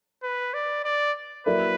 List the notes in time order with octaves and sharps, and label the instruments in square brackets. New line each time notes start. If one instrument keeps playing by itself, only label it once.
[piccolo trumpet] B4
D5
D5
[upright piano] F#3 A#3 E4 A#4 D5 [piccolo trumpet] B4